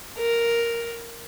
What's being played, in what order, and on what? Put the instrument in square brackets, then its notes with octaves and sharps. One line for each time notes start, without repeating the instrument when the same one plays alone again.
[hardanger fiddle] A#4